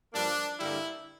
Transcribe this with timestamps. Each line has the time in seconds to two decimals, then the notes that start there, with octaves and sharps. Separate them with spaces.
0.13 G2 F3 A#3 D4
0.60 G2 D3 G3 A#3 E4